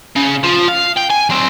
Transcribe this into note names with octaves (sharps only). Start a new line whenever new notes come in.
C#3
F3
F5
G5
G#5
F#3 C4